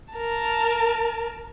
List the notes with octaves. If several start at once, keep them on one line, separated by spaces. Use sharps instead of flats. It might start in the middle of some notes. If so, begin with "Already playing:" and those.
A#4 A5